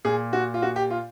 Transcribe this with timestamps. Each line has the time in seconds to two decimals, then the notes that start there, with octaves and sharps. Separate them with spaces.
0.05 A#2 G#4
0.33 F#4
0.54 F4
0.62 F#4
0.76 G4
0.90 F4